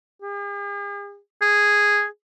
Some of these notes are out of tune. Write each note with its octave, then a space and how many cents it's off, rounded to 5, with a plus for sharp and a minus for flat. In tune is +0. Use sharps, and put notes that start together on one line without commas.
G#4 -45
G#4 -5